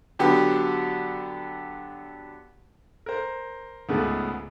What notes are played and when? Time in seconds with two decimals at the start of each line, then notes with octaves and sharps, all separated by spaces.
0.19 D3 F#3 B3 G4
3.06 A#4 C5
3.89 C#2 G#2 C#3 A3 B3 G#4